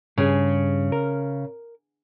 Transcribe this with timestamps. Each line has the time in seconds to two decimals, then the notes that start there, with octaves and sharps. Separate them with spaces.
0.18 G2 C#3 G#4
0.92 A#4